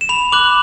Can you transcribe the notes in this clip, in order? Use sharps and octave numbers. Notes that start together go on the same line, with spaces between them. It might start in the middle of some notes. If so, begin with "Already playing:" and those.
E7
B5 F7
D6 F#6 F#7